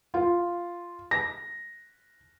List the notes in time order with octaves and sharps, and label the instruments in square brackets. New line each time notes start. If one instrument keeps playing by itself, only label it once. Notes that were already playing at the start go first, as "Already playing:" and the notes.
[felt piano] F4
A#6